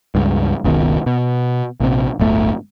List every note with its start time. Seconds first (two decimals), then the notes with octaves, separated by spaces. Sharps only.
0.15 C#2 G2
0.64 F#1 C#2 B2 D#3
1.06 B2
1.80 A#1 C3
2.19 D1 G1 A3